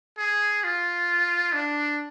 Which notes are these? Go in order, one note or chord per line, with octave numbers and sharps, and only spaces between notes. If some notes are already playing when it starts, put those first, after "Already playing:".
G#4
F4
D4